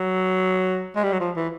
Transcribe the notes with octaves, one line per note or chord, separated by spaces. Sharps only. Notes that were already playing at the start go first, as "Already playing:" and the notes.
Already playing: F#3
G#3
G3
F#3
F3
E3